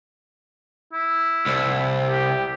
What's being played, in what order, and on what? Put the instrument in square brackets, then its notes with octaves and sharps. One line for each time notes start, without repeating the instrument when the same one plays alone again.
[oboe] E4
[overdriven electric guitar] C2
[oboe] G4